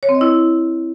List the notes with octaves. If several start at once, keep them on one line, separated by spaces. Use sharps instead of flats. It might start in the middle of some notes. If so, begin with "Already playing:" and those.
C#5
C4
D#5
E4